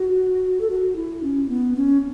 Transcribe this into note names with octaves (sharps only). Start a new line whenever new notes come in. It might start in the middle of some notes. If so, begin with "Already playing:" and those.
Already playing: F#4
A4
F#4
E4
C#4
B3
C#4